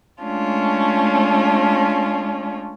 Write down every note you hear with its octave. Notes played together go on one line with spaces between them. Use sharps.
G#3 A3 C#4 D4 F4